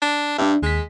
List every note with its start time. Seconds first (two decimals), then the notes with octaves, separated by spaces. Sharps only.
0.02 D4
0.38 G2 D4 D5 E5
0.62 D#2 G#3 B6